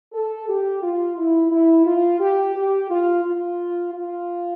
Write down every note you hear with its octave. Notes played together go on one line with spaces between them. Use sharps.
A4
G4
F4
E4
E4
F4
G4
G4
F4
F4
F4